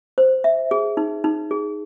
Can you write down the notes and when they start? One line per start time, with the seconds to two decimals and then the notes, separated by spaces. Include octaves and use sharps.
0.18 C5
0.44 E5
0.71 G#4
0.97 D#4
1.24 D#4
1.51 G#4